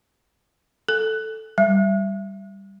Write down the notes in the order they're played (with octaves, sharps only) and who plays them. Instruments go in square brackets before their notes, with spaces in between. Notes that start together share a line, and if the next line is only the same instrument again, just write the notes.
[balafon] A4
G3